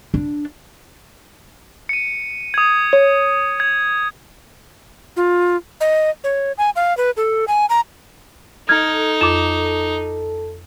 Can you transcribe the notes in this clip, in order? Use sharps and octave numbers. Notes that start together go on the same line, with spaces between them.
D4
C#7 D#7
D#6 G#6
C#5
G#6
F4
D#5
C#5
G#5
F5
B4
A4
G#5
A#5
D#4 A4 F6 G#6
F2 D6 E7